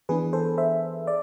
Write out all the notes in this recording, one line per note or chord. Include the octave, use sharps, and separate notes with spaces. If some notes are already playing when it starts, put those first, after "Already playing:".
E3 B3 D4 G#4 B4
A4 C5
C5 E5
D5